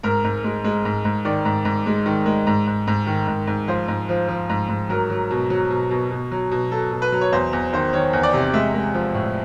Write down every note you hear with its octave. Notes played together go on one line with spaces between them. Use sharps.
G#2 A#4
G#2
G#3
G#3
G#2
G#2
D#3 D5
G#2
G#2
G#3
D#3
G#3
G#2
G#2
G#2
D#3
G#2
G#2
F3 C5
G#2
F3
F3
G#2
G#2
F#3 A#4
F#3
B2
F#3
B2
B2
B2
F#3
B2
F#3 A4
B2
B4
F#3
C#5
E2 C5
E2
D#3 C5
D#3 C#5
E2
D5
C3
G#3 E5
G#3
F3
A2